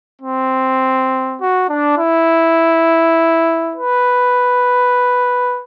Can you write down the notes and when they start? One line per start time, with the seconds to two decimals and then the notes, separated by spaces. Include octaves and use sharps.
0.22 C4
1.40 F#4
1.69 D4
1.98 E4
3.75 B4